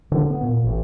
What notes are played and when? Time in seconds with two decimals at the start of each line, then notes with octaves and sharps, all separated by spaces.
0.12 D3
0.30 B3
0.43 A#2
0.64 A1